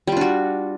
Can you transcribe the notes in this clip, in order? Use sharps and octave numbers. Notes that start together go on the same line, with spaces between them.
G3 D4 F4 F#4